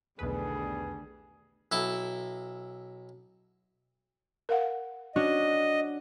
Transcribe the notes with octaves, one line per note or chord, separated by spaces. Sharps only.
B1 E2 D3 D#3 G3 A3 G#4 B4
B1 E4 A4
A#4 F5 F#5
C#4 D4 F#4 D#5